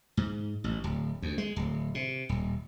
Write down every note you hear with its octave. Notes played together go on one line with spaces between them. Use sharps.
G#2
A1
D1
D2
G#3
D1
C3
D#1